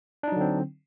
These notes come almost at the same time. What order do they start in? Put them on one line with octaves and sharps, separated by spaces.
D4 D#4 F#3 D3 C4